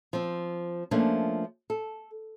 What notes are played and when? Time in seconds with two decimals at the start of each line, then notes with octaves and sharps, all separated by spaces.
0.13 F3 C4
0.91 F3 A3 A#3 C#4 D4
1.70 A4